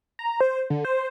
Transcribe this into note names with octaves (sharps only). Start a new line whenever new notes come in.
A#5
C5
D3
C5